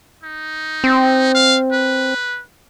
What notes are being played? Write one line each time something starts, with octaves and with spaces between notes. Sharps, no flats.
D#4
C4
F5
B4